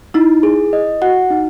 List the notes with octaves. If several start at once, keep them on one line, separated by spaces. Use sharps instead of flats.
D#4 E4
G#4
D#5
F#4 F#5
D#4